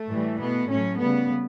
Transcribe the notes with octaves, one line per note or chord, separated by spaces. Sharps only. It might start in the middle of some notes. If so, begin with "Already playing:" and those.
Already playing: A3
A2 E3 G3
B2 A3 B3
A2 F#3 A3 C#4
C#3 G3 B3